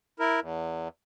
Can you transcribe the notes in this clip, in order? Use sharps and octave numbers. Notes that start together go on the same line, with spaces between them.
E4 A#4
E2